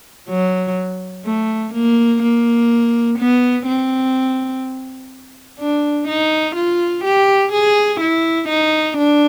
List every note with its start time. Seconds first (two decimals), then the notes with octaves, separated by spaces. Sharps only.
0.29 F#3
1.25 A3
1.74 A#3
2.23 A#3
3.19 B3
3.67 C4
5.59 D4
6.08 D#4
6.56 F4
7.04 G4
7.53 G#4
8.00 E4
8.49 D#4
8.97 D4